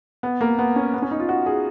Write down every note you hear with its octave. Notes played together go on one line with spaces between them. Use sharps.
B3
A#3
B3
C#4
B3
C#4
D#4
F4
F#4
G#4